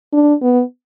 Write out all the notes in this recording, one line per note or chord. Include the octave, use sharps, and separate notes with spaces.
D4
B3